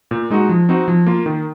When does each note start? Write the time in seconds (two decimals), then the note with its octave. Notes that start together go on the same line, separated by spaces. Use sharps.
0.11 A#2
0.30 G#3 D#4 F#4
0.49 F3
0.69 C4 D#4 F#4
0.88 F3
1.06 A#3 F4
1.26 D#3